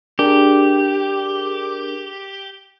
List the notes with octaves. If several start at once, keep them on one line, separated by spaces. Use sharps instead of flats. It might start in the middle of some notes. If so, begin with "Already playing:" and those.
D4 G4 G#4 A#4